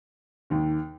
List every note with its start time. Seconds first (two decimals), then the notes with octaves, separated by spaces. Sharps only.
0.50 D#2 D#3